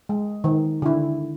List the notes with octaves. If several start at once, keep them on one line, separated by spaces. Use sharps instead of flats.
G#3
D#3
D3 E4